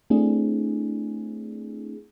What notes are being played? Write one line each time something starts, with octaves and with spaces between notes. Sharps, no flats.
A3 C4 D4 E4 G#4